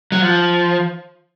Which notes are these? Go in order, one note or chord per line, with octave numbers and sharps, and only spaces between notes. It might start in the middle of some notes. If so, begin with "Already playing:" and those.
F#3
F3